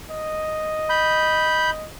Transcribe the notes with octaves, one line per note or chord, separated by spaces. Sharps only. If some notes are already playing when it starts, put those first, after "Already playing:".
D#5
B5 G6